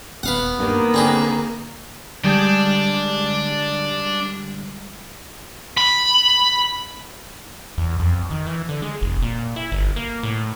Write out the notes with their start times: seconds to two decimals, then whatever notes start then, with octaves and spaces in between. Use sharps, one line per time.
0.23 D#1 B3 B4 F5 F#5
0.59 G2 D#3 A#3
0.94 D3 C4 G#4 B4
2.24 D3 G3 G#3 D4
5.77 B5
7.77 E2
7.99 F2
8.31 D#3
8.47 E3
8.69 D3
8.82 G#3
9.01 F1
9.22 A#2
9.56 E4
9.72 G1
9.96 A#3
10.23 A2